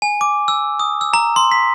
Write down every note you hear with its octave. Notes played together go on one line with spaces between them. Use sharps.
G#5
D6
E6
D#6
E6
A#5
C6
B6